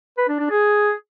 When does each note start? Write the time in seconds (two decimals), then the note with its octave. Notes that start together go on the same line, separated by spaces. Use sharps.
0.17 B4
0.28 D4
0.39 D4
0.50 G#4